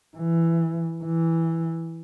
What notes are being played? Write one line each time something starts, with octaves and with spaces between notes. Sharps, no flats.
E3
E3